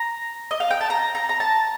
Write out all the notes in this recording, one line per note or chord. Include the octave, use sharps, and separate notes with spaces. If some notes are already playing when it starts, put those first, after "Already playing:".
Already playing: A#5
D#5
F5
G5
A5
A#5
A#5
A#5
A5